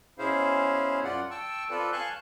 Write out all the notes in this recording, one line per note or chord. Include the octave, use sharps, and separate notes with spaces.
B2 C#4 E4 G#4 C5 F5
F#2 F4 D5 F#5
G5 A5 C#6 E6
C4 F4 A4 B4 D5
F5 G#5 A5 C#6 F#6 G6